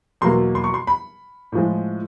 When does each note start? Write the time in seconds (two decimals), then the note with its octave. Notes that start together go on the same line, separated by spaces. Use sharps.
0.21 E2 B2 F#3 A#3 C6
0.55 C6
0.64 C#6
0.74 C6
0.87 B5
1.52 A2 F3 G#3